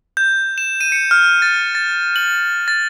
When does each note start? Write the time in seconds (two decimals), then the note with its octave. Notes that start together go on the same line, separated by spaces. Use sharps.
0.17 G6
0.58 E7
0.81 D#7
0.92 C#7
1.11 F6
1.42 A6
1.75 A6
2.16 F#7
2.68 A6